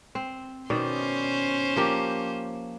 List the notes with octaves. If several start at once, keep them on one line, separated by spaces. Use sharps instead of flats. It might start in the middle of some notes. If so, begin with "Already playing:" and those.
C4
B2 D#3 C#4 C5 D5
F3 A#3 G4